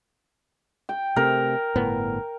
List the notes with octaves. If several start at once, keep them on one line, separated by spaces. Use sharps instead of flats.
G5
C3 A3 A#4
G1 A2 B3